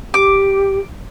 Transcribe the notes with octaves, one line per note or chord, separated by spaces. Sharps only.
G4 D6